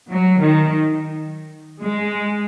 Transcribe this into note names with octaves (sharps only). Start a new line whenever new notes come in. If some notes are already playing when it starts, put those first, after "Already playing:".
F#3
D#3
G#3